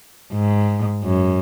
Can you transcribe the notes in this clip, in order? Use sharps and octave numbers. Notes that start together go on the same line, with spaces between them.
G#2
F#2